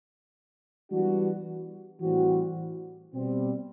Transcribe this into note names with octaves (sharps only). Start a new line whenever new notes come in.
E3 G3 B3 D4 F#4
A2 E3 G3 C4 F#4
B2 G3 C4 G4